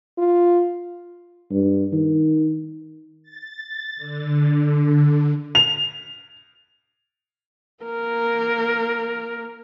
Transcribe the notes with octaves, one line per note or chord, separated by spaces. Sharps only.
F4
G2
D#3
A6
D3
F7
A#3 A#4